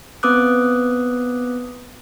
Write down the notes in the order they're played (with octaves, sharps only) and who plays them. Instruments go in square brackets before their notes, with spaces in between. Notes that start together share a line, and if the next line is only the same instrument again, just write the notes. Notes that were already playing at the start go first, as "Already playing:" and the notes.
[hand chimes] B3 C4 B4 D6 D#6 F#6